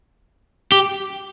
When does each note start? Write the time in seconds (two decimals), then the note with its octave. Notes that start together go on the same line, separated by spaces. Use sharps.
0.72 G4